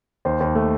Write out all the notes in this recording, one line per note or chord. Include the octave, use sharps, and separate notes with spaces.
D#2 C5
D#2
A3